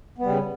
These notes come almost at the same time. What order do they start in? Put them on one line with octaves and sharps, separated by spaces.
B3 G3 C#3